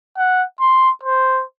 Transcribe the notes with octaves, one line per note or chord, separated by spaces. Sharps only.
F#5
C6
C5